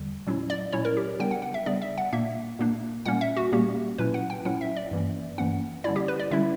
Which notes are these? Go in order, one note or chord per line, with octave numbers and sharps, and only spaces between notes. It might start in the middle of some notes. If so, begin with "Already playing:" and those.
Already playing: E2 D3 G3
A#2 F#3 C#4 E4
D5
A#2 F#3 C#4 E4 C#5
A#4
G4
C#3 G3 B3 D4 G5
F#5
F#5
E5
C#3 G3 B3 D4 D5
E5
F#5
A#2 A#3 D4 E5
A#2 A#3 D4
A#2 G3 A#3 C#4 F#5
E5
F#4
A#2 G3 A#3 C#4 G4
A#2 F#3 C#4 E4 B4
F#5
G5
A#2 F#3 C#4 E4 F#5
E5
D5
G2 E3 A#3 C#4
G2 E3 A#3 C#4 F#5
D3 G3 C#4 E4 D5
G4
B4
D5
D3 G3 C#4 E4 E5